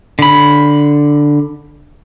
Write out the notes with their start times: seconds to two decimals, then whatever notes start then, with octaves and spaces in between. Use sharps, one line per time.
0.19 D3 B5